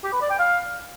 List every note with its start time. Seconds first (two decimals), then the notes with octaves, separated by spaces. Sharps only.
0.04 G4
0.13 B4
0.22 D5
0.30 G5
0.39 F5